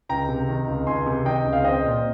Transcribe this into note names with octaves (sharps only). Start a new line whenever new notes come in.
C#2 G5 A#5
C3
D#3
C#2
C#2 G#5 C6
C3
D#3 D#5 G5
C#2
F5
C4 D#5 G5
A#2